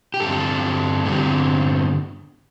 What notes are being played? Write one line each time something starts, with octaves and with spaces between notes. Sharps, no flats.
G4
G2 D3 G3 C4 A4
G2 D3 G3 C4